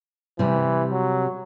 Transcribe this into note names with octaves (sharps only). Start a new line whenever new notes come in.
C3 E3 G3
F#3